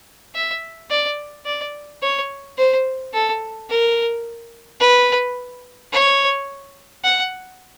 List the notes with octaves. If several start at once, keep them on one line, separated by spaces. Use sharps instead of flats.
E5
D5
D5
C#5
C5
A4
A#4
B4
C#5
F#5